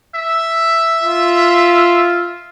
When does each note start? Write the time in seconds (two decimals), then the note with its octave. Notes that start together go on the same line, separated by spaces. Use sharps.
0.15 E5
1.03 F4